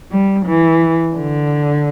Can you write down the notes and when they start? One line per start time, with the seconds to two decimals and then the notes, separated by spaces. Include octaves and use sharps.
0.11 G3
0.46 E3
1.16 D3